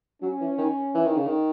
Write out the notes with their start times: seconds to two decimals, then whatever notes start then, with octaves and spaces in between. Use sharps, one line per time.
0.22 F#3 C#4
0.40 E3
0.58 D#3
0.94 E3
1.05 D#3
1.16 C#3
1.26 D#3